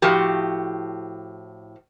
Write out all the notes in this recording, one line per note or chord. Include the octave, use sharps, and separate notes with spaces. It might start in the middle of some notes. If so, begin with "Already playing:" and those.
A2 F3 F#4 G4